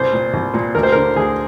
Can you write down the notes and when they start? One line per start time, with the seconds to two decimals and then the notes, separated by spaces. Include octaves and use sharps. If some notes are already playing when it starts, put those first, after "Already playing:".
Already playing: C2 C5
0.13 A#2
0.34 C2
0.54 A#2
0.75 D2 A#4
0.83 C5
0.92 D3 A#4
1.16 D2 G#4